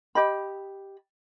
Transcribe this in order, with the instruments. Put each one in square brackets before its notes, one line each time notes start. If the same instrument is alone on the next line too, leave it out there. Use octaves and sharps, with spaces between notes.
[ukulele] G4 D#5 B5